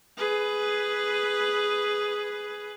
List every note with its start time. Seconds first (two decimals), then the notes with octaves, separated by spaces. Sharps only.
0.17 G#4 B4